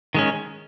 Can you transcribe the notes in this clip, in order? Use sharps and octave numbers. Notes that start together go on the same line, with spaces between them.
D#3 G#3 C#4